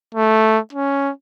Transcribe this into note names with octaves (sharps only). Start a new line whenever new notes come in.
A3
C#4